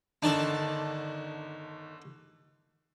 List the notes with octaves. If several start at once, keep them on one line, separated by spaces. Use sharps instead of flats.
G1 D3 D#3 D4 D#4 D5 A5